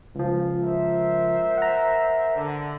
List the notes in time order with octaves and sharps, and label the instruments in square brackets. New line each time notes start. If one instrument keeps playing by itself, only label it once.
[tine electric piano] C#2 F3
[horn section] A#4 C5 E5
[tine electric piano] F#5 A#5
[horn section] D3